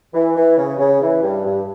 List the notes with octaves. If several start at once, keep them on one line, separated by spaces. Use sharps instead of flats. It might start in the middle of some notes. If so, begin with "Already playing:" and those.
E3
E3
C#3
C#3
E3
G2
G2